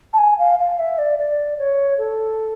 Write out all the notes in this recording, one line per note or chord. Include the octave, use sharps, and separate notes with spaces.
A5
G#5
F5
F5
E5
D5
D5
C#5
A4